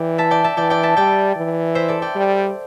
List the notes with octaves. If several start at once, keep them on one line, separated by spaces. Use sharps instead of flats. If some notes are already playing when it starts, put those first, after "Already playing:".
Already playing: E3 D5 G5
E5 A5
D5 G5
E5 A5
E3 D5 G5
D5 G5
E5 A5
G3 D5 G5
E3
C5 E5
A4 D5
D5 G5
G3